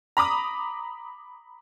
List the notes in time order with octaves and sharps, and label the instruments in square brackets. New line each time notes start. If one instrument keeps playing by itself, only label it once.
[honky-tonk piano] A#5 B5 D6 D#6